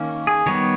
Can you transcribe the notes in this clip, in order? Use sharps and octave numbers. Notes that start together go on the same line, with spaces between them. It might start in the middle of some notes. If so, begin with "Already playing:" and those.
Already playing: D#3 A#3 C#4
G#4
D#3 G3 B3 C#5